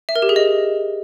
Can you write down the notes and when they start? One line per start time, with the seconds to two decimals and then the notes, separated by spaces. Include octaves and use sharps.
0.09 E5
0.16 A#4
0.22 G4
0.29 G#4
0.36 D#5